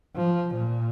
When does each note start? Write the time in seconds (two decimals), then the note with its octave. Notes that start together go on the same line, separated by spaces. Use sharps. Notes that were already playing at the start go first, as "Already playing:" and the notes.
0.16 F3
0.55 A#2